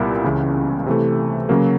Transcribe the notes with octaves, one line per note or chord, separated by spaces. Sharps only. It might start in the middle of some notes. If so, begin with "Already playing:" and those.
Already playing: C2 A#2 G3 B3 E4
C#2 C#3 E3
C3 E3 A3
C#3 F#3 A#3